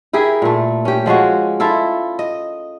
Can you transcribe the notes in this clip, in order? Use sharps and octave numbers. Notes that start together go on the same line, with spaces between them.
E4 G4 G#4 A#4
A#2 A3
C#4 G4
F3 G#3 C#4 F#4
E4 F4 A4
D#5